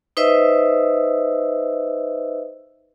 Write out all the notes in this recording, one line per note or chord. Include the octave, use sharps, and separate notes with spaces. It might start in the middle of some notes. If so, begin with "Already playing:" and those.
D#4 B4 C5 D#5 E5 E6